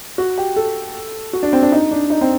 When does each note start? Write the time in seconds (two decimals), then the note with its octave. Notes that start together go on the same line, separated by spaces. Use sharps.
0.18 F#4
0.38 G4
0.56 A4
1.33 F#4
1.43 D4
1.53 C4
1.63 D4
1.72 D#4
1.91 D4
2.10 D#4
2.21 C4